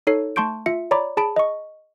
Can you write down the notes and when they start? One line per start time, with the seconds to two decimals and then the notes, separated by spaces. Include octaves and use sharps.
0.07 D#4 A4 C#5 C7
0.36 A3 A5 C6 C#6 G6 D7
0.66 F4 E5 C#7
0.91 C#5 D5 A#5 B5 D6
1.17 G#4 A5 B5 D7
1.36 D#5 C#6